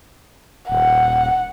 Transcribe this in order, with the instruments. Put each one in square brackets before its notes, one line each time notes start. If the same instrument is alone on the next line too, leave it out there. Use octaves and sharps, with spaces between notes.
[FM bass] D#1 [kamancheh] F#5